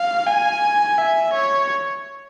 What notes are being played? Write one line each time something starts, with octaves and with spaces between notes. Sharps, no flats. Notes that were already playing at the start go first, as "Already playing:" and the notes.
Already playing: F5
G#5
E5
C#5